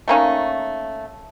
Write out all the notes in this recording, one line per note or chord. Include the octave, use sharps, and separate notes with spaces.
A3 A#3 C#4 D#4